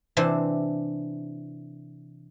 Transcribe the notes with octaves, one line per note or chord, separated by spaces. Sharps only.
C3 E3 D4 C5